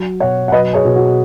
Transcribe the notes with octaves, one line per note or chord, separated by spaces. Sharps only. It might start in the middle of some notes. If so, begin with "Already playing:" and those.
Already playing: F#3
B2 C#5 F#5
F#5
F#3 B4 D#5
G#4 C#5
B2
F#4